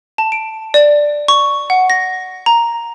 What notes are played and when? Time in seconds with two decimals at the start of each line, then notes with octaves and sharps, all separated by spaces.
0.18 A5
0.32 D7
0.74 D5
1.28 C#6
1.70 F#5
1.90 A#6
2.46 A#5